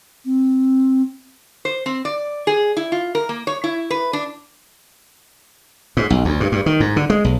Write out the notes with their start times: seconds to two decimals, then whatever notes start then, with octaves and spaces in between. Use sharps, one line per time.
0.25 C4
1.65 C5
1.86 C4
2.05 D5
2.47 G#4
2.77 E4
2.92 F4
3.15 A#4
3.29 A#3
3.47 C#5
3.64 E4
3.90 B4
4.13 D4
5.97 G#2
6.10 B1
6.25 D2
6.40 G2
6.52 G2
6.66 D#3
6.80 G#2
6.96 D3
7.10 G#3
7.24 B1